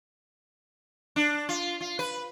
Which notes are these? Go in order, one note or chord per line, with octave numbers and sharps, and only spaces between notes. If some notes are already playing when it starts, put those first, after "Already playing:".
D4
F4
F4
B4